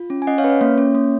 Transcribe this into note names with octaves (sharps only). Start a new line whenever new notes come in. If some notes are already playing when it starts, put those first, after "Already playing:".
Already playing: F4
C#4
G#5
C#4 D#5 F#5
C#5 F5
C#4 B4
C#5
A#3
C#4
A#3